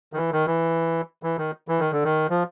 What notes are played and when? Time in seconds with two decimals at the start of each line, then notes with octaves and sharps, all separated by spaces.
0.13 D#3
0.17 E3
0.32 D#3
0.47 E3
1.23 E3
1.38 D#3
1.68 E3
1.80 D#3
1.92 D3
2.04 D#3
2.30 F3